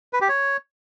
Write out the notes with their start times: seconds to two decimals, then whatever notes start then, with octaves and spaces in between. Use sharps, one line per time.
0.13 B4
0.21 G4
0.29 C#5